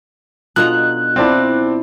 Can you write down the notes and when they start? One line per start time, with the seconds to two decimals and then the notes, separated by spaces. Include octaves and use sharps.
0.56 B2 D4 D#4 F4 A4 A#5 F#6
1.16 C4 E4 F4 D5 A5